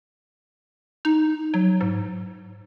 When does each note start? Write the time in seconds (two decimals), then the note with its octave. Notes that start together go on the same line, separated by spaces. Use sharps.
1.05 D#4
1.54 F#3
1.81 G#2